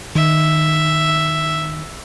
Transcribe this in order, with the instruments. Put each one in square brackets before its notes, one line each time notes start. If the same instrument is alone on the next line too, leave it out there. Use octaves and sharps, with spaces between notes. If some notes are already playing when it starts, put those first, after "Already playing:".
[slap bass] D#3 [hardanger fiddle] E5